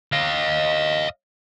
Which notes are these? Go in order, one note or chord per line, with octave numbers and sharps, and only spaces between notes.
D#5 F5